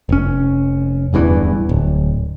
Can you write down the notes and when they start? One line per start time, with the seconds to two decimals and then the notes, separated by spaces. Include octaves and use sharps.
0.09 F1 C#4
1.13 D1 E2 G2 E3
1.69 D1